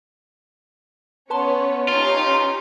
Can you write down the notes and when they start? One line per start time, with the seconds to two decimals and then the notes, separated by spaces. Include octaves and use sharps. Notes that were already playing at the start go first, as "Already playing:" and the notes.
1.30 B3 C#4 B4 C#5 A5 C6
1.88 C#4 D#4 F4 G4